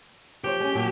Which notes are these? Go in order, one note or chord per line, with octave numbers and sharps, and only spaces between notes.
F3 G4 C5 C#5
G#3 C#4
A#2 F3 F#3